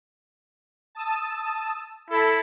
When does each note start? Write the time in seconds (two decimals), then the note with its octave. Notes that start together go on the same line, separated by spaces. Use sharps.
0.95 A5 D#6 E6
2.10 E4 A4